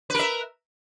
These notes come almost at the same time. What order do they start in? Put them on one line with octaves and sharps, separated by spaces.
B4 A#4 E5